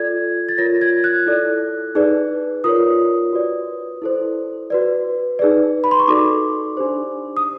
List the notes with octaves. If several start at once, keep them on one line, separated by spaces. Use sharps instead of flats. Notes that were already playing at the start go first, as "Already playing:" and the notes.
Already playing: F4 A4 D5 G#6
A6
F4 A#4 C#5 A#6
G#6
F#6
E4 A4 D5
D#4 G#4 B4 D5
F4 A#4 C#5 D#6
F#4 B4 D5
E4 A4 C5
F#4 B4 D5
D#4 G#4 B4 D5
B5
C6
C#6
D#4 F#4 A4 D5 D6
D4 G4 C5
D#6